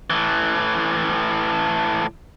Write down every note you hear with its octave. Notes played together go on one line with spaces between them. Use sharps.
A2 E3